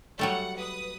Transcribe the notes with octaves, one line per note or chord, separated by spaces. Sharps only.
F#3 G3 A3 F#5
B4 D#6